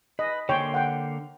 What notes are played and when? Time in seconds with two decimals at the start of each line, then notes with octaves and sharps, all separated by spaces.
0.19 B4 D#5
0.49 D3 A#3 C#5 G5 C6
0.74 F#5 G5